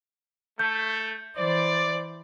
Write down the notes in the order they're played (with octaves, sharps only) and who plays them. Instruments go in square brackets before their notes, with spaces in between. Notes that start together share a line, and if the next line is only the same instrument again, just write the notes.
[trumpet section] A3 [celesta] G6
[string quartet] E3 C5 [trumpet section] D5